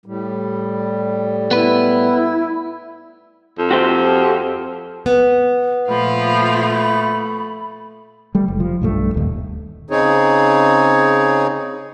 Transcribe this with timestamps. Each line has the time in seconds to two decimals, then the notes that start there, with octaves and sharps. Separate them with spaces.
0.06 A2 G3
1.51 B3 E4 B4
3.58 F2
3.71 F#4 G4 C5
5.06 B3
5.89 A#2 F3 A3 F4 B5
8.35 G3 A3
8.48 F#1
8.60 F3
8.81 B1 G2 A3
9.14 D#1 D#2
9.90 C#3 C4 D#4 G#4 C#5